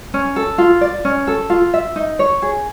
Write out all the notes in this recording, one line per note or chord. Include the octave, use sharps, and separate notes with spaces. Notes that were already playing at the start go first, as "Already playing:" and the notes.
C#4
A4
F4
D5
C#4
A4
F4
E5
D#4
C#5
G#4